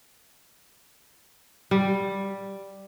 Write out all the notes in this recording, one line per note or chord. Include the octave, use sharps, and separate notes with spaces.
G3